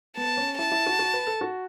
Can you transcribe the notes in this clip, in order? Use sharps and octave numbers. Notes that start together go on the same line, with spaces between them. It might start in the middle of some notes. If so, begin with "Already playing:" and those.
B3 A5
C#4
E4 A5
E4
F#4
F#4
B4
A4
F#4